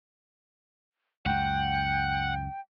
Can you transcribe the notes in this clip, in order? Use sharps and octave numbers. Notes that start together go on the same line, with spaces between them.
C#2 F#2 F#5 G5